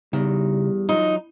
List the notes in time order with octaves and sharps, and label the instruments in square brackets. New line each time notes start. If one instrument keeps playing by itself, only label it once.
[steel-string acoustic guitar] E2 [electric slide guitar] C#3 D#4 [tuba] G3
[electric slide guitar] F#3 F4 [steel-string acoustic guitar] D#4